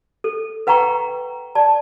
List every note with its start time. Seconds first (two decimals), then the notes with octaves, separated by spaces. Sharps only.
0.24 A4
0.67 B4 F#5 G5 A#5 C#6
1.55 D5 A5